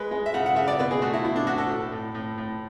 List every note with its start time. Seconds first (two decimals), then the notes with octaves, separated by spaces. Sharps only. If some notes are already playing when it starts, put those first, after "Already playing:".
Already playing: G#3 B4
0.11 G#3
0.26 E5
0.34 C#3 F#5
0.46 F#5
0.56 C#3 E5
0.68 D5
0.79 B2 B4
0.91 G#4
1.02 A3 F#4
1.13 E4
1.24 B2 E4
1.36 D4
1.46 A3 F#4
1.58 A4
1.69 A2
1.92 A2
2.15 A2
2.38 A2